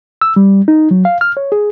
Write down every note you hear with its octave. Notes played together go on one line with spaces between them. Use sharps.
E6
G3
D#4
F#3
F5
F6
C#5
G#4